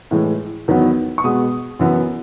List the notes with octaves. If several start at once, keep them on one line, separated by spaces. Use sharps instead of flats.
A2 E3 G#3
E2 D#3 F#3 B3
C#6
B2 G#3 B3 D#6
F#2 E3 B3